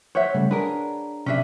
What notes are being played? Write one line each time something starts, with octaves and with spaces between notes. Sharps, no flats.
C5 C#5 E5 F#5
C#3 G3 A3
D4 G#4 A#4 B4
C3 C#4 D4 E5